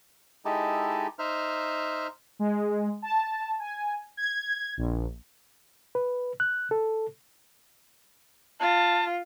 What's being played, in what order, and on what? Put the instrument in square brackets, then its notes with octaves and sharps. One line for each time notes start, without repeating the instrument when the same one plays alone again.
[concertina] G#3 D#4 E4 G4 A4
D#4 C5 E5 F6
[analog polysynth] G#3
A5
G#5
G#6
A#1
[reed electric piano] B4
F#6
A4
[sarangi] F4 [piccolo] A5